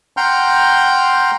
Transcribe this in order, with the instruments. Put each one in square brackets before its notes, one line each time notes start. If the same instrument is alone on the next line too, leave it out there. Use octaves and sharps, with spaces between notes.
[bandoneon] F#5 G5 A#5 C6 F6 G6